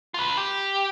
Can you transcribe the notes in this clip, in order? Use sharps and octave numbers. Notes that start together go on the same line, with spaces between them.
F4 B4
G4